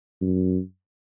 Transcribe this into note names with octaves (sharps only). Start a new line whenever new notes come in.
F#2